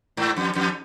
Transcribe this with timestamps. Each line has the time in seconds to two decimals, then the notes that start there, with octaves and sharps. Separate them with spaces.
0.17 G#2
0.37 F2
0.55 F2